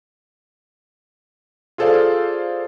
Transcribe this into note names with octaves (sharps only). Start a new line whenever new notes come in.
F4 G#4 A4 C5 D5 F5